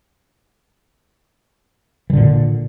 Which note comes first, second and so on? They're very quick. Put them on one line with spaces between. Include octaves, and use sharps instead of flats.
E3 D3 A#2